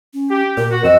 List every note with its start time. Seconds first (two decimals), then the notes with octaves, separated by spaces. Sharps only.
0.14 C#4
0.31 G4
0.57 A#2 A#4
0.71 F#4
0.84 F2 C4 F#4 D#5 E6